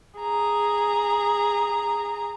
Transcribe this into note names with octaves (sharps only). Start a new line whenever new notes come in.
G#4 A#5